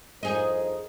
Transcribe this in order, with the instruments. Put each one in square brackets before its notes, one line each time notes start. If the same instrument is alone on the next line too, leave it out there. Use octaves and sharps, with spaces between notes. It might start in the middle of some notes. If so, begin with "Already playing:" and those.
[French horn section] F2 A#4 C5 [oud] D#4 G#4